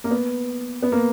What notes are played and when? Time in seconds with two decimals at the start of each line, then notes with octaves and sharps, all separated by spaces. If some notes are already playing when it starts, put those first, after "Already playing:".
0.04 A#3
0.11 B3
0.82 B3
0.92 A#3